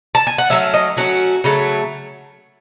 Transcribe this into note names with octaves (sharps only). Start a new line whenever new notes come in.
A5
G#5
F#5
F#3 A3 C#4 E5
D#5
F#3 A3 C#4 F#4
C#3 F#3 A3